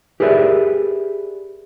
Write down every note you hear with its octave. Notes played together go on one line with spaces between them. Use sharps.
G4 G#4 A#4 B4 D5 E5